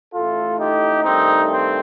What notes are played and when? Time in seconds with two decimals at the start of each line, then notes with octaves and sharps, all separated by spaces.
0.14 A1 A2 A3 F4 A4
0.58 D#4 G4
1.03 G2 D#3 A3 C4 D#4
1.49 C4